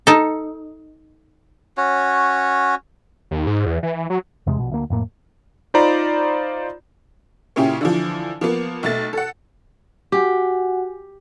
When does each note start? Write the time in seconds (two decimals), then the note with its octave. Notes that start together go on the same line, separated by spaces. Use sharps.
0.07 D#4 A4
1.77 C#4 F#4 C#5
3.31 D#2
3.47 G#2
3.66 E2
3.83 E3
4.10 F#3
4.47 E2 C3 G#3
4.59 A#1 B2
4.71 D2 A#3
4.90 F2 A2 A#3
5.74 D#4 F4 C5 D5 A#5 B5
7.56 A#2 C#3 C#4 E4 G4
7.81 D3 E3 F3
8.41 F3 A#3 B3
8.83 B1 A3 A6
9.13 A4 F#5
10.12 F#4 G4 F#5 G#5